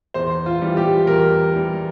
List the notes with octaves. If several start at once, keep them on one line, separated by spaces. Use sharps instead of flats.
E2 C5
F4
E3 G3
G4
E2 A#4
E3 G3